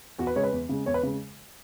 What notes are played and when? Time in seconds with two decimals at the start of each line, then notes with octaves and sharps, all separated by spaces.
0.19 E2 F#4
0.27 B4
0.36 C#3 G#3 C#5
0.43 B4
0.53 E2
0.69 C#3 G#3
0.86 E2 C#5
0.94 B4
1.03 C#3 G#3